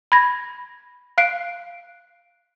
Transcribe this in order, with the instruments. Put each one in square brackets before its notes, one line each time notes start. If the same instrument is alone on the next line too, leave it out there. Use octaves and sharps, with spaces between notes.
[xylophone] B5 G#6 A#6
F5 F#6 C7 D7